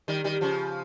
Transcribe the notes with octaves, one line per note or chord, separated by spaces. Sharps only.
D#3 G3
D#3 G3
C#3 F3